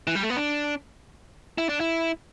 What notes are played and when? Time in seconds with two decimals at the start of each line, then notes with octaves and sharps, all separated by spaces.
0.07 E3
0.15 G3
0.23 A3
0.30 B3
0.37 D4
1.58 E4
1.69 D4
1.80 E4